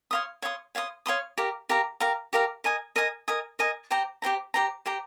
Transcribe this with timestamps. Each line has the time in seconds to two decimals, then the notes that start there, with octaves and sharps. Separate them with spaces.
0.11 C#5 F5 C6 D#6
0.42 C#5 F5 C6 D#6
0.75 C#5 F5 C6 D#6
1.06 C#5 F5 C6 D#6
1.38 G4 A#4 F5 A#5
1.69 G4 A#4 F5 A#5
2.00 G4 A#4 F5 A#5
2.33 G4 A#4 F5 A#5
2.64 A#4 D#5 G#5 D#6
2.96 A#4 D#5 G#5 D#6
3.28 A#4 D#5 G#5 D#6
3.59 A#4 D#5 G#5 D#6
3.91 G4 C5 G5 A#5
4.22 G4 C5 G5 A#5
4.54 G4 C5 G5 A#5
4.86 G4 C5 G5 A#5